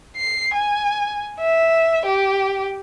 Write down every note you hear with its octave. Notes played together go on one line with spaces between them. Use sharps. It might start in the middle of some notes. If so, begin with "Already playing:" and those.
C7
G#5
E5
G4